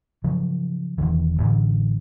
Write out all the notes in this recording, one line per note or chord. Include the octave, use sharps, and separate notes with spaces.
C#3 F3 F#3
E1 C3 D#3 E3
A1 A2 D3